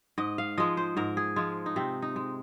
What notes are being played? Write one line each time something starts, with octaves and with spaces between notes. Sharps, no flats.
G#2 D#5
F5
F3 G#3 D#5
C5
G#2 A#4
G#4
F3 G#3 F4
D#4
C3 C4
D#4
G#3